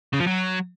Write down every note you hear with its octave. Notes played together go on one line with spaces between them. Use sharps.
C#3
F3
F#3